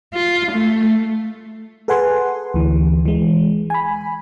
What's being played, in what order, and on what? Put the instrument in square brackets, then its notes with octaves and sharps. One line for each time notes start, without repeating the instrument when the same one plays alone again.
[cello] F4
A3
[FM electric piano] G#4 A4 B4 F#5 G#5 C6
D2 E3
E3 G#3
G#5 B5